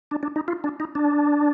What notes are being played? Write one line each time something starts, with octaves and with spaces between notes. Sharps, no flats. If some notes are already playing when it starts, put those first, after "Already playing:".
D4
D4
D#4
F4
D4
D#4
D4